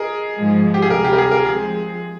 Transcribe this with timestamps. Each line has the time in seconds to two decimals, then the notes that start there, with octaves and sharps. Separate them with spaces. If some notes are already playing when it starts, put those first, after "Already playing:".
Already playing: G#4 A#4 D#5
0.36 G#2 F3 G#3
0.74 G4
0.82 G#4
0.90 D2 C3 G3 A#4
1.04 G4
1.13 A#4
1.18 G#4
1.31 A#4
1.46 F3 G#3 C4 G#4